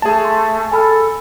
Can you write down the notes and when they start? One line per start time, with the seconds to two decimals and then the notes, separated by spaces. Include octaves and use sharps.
0.02 A3 G#4 A5
0.25 C6
0.72 A4 G#5 B5 F6